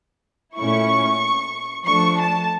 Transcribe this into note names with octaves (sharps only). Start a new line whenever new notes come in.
A#2 A3 C#4 E4 C#6
F3 A3 D4 C#6
A5